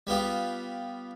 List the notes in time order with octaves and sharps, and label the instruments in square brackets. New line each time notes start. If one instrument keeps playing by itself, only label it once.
[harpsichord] G3 B3 F4 G4